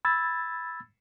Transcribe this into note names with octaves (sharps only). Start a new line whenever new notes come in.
B5 E6 G#6 A6